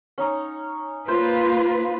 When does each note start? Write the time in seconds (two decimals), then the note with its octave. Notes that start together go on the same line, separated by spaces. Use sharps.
0.18 C#4 D#4
1.08 A#3 F4 B4 C5